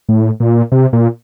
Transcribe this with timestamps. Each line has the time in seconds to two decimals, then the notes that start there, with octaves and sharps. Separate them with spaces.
0.09 A2
0.40 A#2
0.72 C3
0.93 A#2